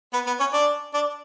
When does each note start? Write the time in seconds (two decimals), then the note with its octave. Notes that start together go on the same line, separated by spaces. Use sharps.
0.13 B3 B4
0.26 B3 B4
0.40 C#4 C#5
0.53 D4 D5
0.94 D4 D5